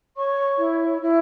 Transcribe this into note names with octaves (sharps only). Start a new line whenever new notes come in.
C#5 C#6
E4
E4